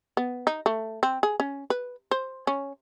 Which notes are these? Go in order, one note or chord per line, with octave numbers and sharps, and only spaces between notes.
B3
D#4
A3
C4
G#4
C#4
B4
C5
C#4